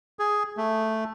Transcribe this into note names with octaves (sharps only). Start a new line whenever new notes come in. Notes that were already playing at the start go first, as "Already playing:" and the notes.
G#4
A3